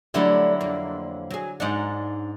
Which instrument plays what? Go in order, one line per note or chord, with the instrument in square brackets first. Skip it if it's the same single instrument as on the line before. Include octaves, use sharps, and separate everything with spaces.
[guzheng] D3 F#3 E4 [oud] G3 A3 D5
[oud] F2 A#3
F#3 G#4
[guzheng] G#2 F#5 [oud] D4 D#4